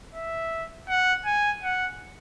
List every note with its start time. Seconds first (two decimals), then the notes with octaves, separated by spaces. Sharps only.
0.15 E5
0.89 F#5
1.25 G#5
1.62 F#5